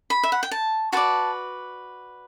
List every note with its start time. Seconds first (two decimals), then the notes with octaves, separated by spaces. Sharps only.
0.10 B5
0.23 E5
0.32 F#5
0.43 G5
0.51 A5
0.92 F#4 B4 D5 A5